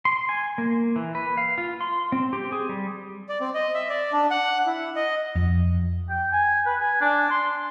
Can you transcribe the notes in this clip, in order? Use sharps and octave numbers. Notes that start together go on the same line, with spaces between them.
C6
G#5
A#3
E3
B4
F5
F4
C6
C4
G4
G#4
G3
D5
C4
D#5
E5
D5
D4
F#5
E4
D#5
F2
G5
G#5
B4
G#5
D4
C6